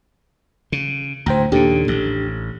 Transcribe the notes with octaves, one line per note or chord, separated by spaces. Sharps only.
C#3
D2 A2 C5 G5 A#5
D#2 A#2 C#3 D4 G4 A4
A1